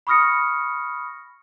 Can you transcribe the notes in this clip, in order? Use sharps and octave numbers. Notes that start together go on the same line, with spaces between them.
B5 C#6 D#6 F6 A#6 C#7